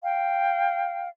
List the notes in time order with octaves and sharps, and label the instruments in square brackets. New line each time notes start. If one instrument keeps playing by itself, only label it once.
[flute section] F5 G5